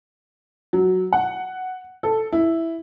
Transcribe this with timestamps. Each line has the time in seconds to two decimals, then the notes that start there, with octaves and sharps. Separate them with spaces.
0.73 F#3
1.13 F#5
2.03 A4
2.32 E4